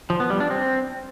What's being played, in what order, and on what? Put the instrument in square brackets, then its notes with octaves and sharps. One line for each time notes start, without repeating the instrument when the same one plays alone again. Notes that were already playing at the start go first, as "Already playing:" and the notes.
[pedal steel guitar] F3
B3
G3
D4
C4